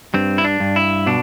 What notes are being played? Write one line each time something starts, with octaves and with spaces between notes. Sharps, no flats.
G2 C4
E4
D4
G2
E4
B2 D4